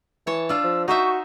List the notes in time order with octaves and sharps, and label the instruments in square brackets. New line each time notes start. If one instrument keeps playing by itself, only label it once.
[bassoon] E3 [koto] C#5 A5
[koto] D4 F4 [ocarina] E6
[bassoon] F3
[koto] D#4 C5 E5 [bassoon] F#4 [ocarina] C#6